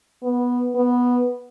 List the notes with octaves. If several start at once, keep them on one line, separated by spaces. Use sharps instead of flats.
B3
B3